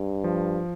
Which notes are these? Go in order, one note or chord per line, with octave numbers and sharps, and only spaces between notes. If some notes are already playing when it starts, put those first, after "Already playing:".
Already playing: G2
F3